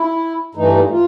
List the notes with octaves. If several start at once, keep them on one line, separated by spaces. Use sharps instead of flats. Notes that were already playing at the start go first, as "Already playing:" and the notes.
Already playing: E4
G2 E3 A3 D#4
F4